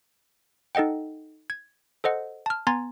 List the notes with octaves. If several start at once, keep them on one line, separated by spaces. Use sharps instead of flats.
D#4 A4 D#5 F#5 G5
G#6
A4 C5 D#5 F#5
A5 F6
B3 G#5 A#5 C6 G#6 A6